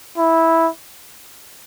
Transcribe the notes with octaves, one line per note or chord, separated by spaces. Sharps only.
E4